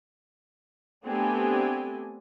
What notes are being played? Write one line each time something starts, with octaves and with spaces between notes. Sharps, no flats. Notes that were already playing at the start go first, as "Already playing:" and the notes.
A3 B3 C4 D4 G4 G#5